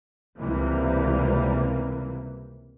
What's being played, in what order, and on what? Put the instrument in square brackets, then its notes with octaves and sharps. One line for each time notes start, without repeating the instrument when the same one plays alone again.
[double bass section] C#2 C3 E3 G3 A#3